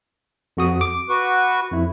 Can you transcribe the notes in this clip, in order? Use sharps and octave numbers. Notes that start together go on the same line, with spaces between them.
F2 F#4 D#6
D6
F#4 B4 C#6
F2 E4